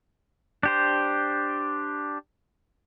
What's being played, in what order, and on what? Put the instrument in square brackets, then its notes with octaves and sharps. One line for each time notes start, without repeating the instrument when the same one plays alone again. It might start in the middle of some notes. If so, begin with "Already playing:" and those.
[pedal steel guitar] D4 G4 C5